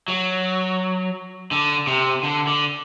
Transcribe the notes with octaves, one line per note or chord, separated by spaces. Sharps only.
F#3
D3
C3
D3
D3